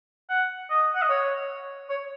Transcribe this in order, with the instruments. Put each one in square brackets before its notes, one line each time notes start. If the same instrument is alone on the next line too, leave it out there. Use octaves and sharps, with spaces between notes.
[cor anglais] F#5
D#5
F#5
D#5
C#5
C#5